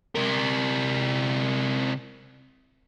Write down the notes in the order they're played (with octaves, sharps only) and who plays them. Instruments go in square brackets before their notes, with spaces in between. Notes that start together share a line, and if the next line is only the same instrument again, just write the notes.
[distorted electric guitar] C3 A#4